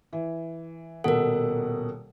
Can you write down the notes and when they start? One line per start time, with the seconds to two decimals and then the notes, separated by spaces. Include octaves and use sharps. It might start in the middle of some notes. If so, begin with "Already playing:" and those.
0.13 E3
1.04 D#1 B2 A4 A#4 F#5